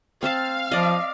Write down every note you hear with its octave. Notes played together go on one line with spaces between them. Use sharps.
C4 C5 F5 A5
F3 D5 D#5